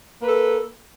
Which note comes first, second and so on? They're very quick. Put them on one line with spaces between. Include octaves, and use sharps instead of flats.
A#3 B4 A4